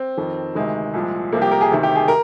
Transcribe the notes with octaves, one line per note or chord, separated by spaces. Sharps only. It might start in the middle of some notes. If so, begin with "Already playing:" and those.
Already playing: C4
F2 D#3
D2 C3 D#3 G#3
C2 A#2 F3
C2 C3 F3 A#3
G4
A#4
G#4
D2 C3 D#3
G4
G#4
A#4